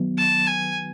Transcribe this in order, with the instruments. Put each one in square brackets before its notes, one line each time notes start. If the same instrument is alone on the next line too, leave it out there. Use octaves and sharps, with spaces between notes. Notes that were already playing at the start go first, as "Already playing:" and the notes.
Already playing: [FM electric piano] D#3 F#3 B3
[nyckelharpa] A5
G#5